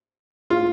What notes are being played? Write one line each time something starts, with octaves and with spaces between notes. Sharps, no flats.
F4